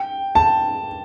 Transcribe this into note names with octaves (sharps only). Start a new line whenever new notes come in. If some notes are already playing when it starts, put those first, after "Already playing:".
Already playing: G5
A5